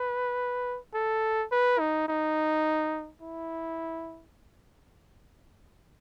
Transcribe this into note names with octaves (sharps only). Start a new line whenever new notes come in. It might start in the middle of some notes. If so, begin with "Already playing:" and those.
Already playing: B4
A4
B4
D#4
D#4
E4